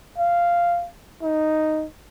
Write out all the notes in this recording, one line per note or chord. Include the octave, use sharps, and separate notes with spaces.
F5
D#4